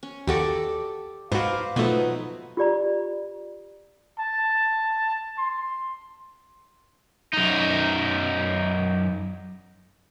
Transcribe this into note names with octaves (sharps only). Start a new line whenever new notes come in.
C#4
D#2 F#4 G4 A4 D5
G#2 F#4 B4 C5 D5 F5
B2 F3 F#3 A3 D#4 B4
F4 G4 D5 A#5
A5
C6
F#2 D#4